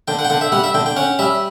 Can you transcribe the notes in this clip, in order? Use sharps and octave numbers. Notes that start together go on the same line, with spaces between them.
D3 G5
F#5
G5
D3 F#5
E5
G3 F#5
E5
D3 G5
G5
C#4 F#5
G3 E5